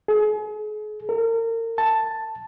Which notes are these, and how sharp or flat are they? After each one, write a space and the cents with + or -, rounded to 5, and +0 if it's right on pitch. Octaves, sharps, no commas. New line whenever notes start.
G#4 +40
A#4 -35
A5 +5